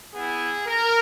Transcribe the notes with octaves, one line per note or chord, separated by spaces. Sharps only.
B3 E4 G#4
A#4